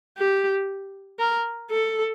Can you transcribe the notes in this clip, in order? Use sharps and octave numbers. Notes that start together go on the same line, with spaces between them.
G4
A#4
A4